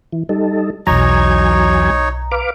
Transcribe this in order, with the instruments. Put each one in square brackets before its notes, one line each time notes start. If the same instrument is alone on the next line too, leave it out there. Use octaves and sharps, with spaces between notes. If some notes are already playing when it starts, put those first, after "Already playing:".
[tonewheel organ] E3
G3 D#4 A4
[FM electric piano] B1 A#5 [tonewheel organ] E2 F#3 G#5 [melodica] D#4 C#5
[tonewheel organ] B4 F5 D6